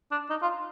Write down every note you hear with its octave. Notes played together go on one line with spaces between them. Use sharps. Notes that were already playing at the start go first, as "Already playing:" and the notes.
D4
D#4
F4